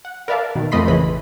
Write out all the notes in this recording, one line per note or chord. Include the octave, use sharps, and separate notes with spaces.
F#5
A#4 B4 D5 E5 F5 A5
B2 D#3
F2 A3 D#5 B5 C6 B6
A1 C#3 E3 B5